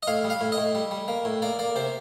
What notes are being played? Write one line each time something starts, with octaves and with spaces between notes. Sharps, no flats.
D#5
A2 F5
G3
F5
A2
D#5
A2
G3
G3
A#3
A2
A#3 D5
A#3 D5
C3 C5